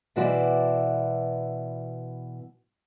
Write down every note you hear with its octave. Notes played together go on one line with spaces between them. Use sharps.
B2 E3 F#4 C5 D5 E5